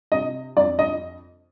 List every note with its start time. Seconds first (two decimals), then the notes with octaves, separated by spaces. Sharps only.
0.12 C3 D#5
0.57 F2 D5
0.79 D#5